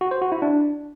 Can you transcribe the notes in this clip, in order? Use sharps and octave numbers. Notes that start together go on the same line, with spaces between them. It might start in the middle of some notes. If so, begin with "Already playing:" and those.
F#4
C5
F#4
E4
D4